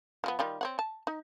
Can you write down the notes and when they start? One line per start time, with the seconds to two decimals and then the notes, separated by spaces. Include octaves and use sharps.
0.24 F3 G#3 B3
0.39 D#3 G3 F4
0.61 C4 C#5 F#5
0.79 A5
1.07 D#4